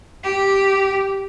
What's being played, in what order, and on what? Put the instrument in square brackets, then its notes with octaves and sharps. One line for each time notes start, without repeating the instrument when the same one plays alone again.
[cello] G4